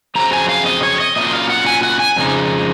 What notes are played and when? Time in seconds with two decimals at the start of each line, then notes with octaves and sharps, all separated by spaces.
0.15 F2 C#3 F#3 C4 A#5
0.33 G#5
0.49 F5
0.66 D#5
0.83 C#5
1.00 D#5
1.16 A#2 F#3 C#4 F4 D#5
1.33 F5
1.50 F#5
1.66 G#5
1.83 F#5
2.00 G#5
2.16 F2 C#3 G#3 D#4